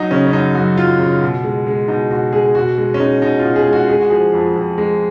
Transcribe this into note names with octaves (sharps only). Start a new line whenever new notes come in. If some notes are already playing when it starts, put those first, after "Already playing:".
Already playing: F#3 D#4
C#3 C#4
C#4
F#2 D#4
F#2 F#4
F#3 F4
C#3
B2
G#3
G#3
B2 D#4
B2 F#4
G#3 G#4
B2 F#4
G#3
C#4
G#3 D#4
B2 D#4
F4
B2
G#4
G#3
F#4
G#3 G#4
F#4
F3 G#4
F2
F2
G#3